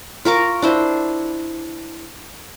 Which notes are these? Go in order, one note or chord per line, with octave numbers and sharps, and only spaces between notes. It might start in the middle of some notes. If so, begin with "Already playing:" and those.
F4 A#4 C#6 D6
D4 E4 C5